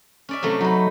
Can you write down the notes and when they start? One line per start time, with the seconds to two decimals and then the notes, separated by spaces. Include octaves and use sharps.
0.29 C#4 D5 E5
0.43 C3 F#3 A3
0.61 F#3 D#4 B4